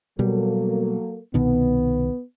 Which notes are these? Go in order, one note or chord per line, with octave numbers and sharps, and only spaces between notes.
B2 F#3 G3 A#3 A4
C2 B2 D#3 B3